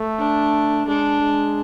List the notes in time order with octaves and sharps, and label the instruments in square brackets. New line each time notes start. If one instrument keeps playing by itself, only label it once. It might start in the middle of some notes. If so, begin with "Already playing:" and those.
Already playing: [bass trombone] A3
[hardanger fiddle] D4
[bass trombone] G#3 [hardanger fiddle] D4
[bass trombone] G#3